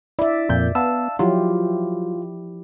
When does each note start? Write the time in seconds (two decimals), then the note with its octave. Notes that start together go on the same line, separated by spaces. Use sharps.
0.19 E4 D5 E5
0.49 F2 A#2 G6
0.75 B3 F5 A5 E6
1.19 F3 F#3 E4 F4 G4